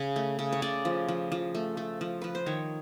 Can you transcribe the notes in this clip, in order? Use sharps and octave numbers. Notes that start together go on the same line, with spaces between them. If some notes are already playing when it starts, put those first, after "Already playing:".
Already playing: C#3
A3
C#3
C#5
C#3 D5
F3
F3
F3
A3
A3
F3
F3 B4
C5
D#3 C#5